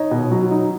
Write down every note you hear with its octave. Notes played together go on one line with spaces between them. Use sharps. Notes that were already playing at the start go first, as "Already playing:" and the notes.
Already playing: D#4 C#5 D#5
B2
F#3
D#4